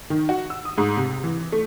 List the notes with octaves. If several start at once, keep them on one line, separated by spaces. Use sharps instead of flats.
D#3
F#4
E6
D#6
G#2
C3
E3
A3